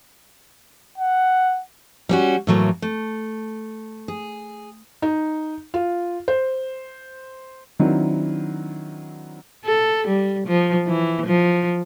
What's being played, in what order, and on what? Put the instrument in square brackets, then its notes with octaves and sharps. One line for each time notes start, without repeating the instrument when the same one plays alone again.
[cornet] F#5
[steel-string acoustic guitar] G3 C#4 F#4
A2 E3 F#3 A3 A#3
A3
G#4
[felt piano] D#4
F4
C5
D#3 F#3 C4 D4 E4
[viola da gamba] A4
G3
F3
E3
F3